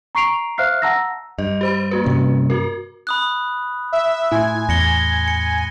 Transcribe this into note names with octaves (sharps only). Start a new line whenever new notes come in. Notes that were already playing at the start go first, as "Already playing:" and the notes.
A#5 C#6 C7 D7 F7
C5 E5 F5 F6 F#6 C7
F#5 A5 A#5 E6 A#6
G2 D#5
G4 C5 B5
A#3 F#4 B4
G2 C3 C#4
F#4 A#4
B5 D#6 F#6
E5
A2 E4 G#5 C6
E2 A#6 C#7 G7
C#7